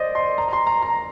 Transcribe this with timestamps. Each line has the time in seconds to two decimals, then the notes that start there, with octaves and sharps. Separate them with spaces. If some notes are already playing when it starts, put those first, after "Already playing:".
Already playing: C5 D5 D#5
0.15 C6
0.38 A#5
0.48 A#5
0.53 C6
0.67 A#5
0.82 A#5